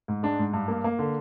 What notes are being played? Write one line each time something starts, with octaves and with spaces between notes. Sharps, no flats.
G#2
G#3 D4
G#2
G2
A#3
A#3
D3